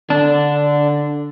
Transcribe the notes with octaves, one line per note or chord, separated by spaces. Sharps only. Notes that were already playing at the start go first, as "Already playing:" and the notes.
D3 D4